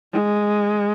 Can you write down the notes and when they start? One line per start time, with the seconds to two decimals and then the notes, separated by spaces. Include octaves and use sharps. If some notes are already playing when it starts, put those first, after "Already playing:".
0.13 G#3